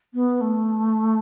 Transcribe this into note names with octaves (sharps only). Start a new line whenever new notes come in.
B3
A3